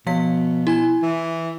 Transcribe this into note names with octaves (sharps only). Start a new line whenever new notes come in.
B2 F3 F5 B6
E4 G#5 G#6
E3